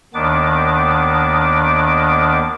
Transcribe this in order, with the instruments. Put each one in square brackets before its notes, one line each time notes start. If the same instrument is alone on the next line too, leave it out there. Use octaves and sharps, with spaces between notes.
[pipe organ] D#2 D#3 B3 D4 D6